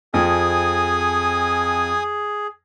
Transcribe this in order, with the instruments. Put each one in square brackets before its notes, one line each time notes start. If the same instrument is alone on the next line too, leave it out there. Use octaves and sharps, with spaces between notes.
[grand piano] F2 F3 C4 [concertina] G#4 [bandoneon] G#5 D#6